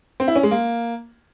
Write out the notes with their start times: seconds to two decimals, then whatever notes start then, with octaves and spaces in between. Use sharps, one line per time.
0.20 C4
0.28 E4
0.35 C#4
0.43 G#3
0.51 A#3